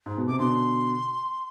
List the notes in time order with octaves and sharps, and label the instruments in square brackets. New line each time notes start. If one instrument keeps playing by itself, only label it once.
[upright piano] G#2
B2
[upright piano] C3 [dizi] D6
[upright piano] B2 D3 [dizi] C6